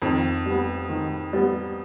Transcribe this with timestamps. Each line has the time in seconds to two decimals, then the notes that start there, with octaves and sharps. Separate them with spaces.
0.02 F2 D#3
0.46 G3 B3
0.89 D#3
1.33 G3 B3